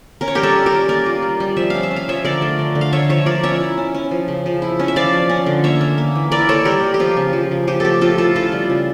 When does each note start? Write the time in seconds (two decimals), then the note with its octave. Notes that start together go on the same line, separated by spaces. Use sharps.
0.21 C#4 A#4
0.28 C#5
0.35 G3 G4 A#4
0.43 A4 C#5
0.56 G3
0.66 G4 A#4
0.72 C#4
0.88 A#3 A#4 D5
1.06 F4
1.22 G3
1.40 G3
1.57 F3 E5
1.70 C#4 F5
1.83 E5
1.91 C#4
1.96 F5
2.08 F3 C#5 E5
2.25 D3 A#4 D5
2.42 A3
2.59 D3
2.75 D3
2.81 F5
2.93 A3 C#5 E5
3.09 F3 C#5 E5
3.26 F3 A#4 D5
3.43 C#4 C#5 E5
3.60 E4
3.78 C#4
3.94 C#4
4.11 F3
4.28 C#3
4.46 F3
4.62 E4
4.80 C#4
4.88 E5
4.96 F3 D5 F5
5.13 F3
5.29 C#4
5.46 D3
5.64 A#3 C#5 E5
5.81 A#3
5.98 A#3
6.15 E3
6.31 E4 A#4 D5
6.49 A#3 A4 C#5
6.65 G3 G4 A#4
6.83 G3
6.94 G4
6.99 F3 F4
7.17 C#3
7.33 F3
7.51 C#3
7.67 F3 G4
7.80 A3 G4 A4
8.01 F3 F4 A4
8.18 E4 F4 A4
8.35 C#4 F4 A4
8.52 G3
8.70 C#3